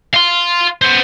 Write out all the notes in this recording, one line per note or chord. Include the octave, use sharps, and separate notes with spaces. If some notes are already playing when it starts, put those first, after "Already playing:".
F5 C6
B3 C5